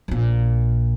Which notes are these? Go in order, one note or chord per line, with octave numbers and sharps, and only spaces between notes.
A#1 A#2